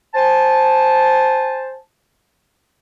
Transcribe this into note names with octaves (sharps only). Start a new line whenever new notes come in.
C5 G#5 A5